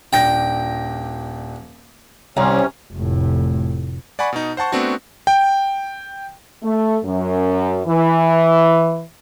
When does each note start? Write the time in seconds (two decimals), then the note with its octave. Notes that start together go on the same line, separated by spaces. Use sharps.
0.13 D#1 D4 G5 A#6
2.37 C2 C3 C#4 A#5 C6
2.93 F1 A2
4.19 D5 F#5 G#5 B5 C#6
4.33 B2 D#4
4.57 C5 F#5 A5 C#6
4.72 A3 B3 C4 D4 F#4
5.27 G5
6.64 A3
7.05 F#2
7.86 E3